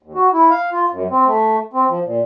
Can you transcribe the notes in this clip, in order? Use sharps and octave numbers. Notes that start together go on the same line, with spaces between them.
D#2
F#4
E4
F5
F4
F#2
C4
A3
C4
F3
A#2